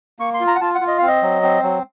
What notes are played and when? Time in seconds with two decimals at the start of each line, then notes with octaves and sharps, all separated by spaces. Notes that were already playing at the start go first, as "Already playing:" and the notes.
0.19 A#3 C#6
0.34 C6
0.40 F4
0.47 A#5
0.55 F#5
0.61 F4 A5
0.75 F#5
0.81 F4
0.87 D#5
0.98 C4 F5
1.08 D#5
1.22 F#3
1.43 C4
1.63 F#3